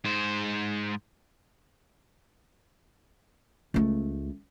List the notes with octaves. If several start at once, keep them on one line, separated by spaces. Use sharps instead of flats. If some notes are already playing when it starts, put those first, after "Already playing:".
G#2 C5
C#2 A3